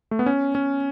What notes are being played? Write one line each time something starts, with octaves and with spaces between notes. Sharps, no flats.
A3
B3
C#4
C#4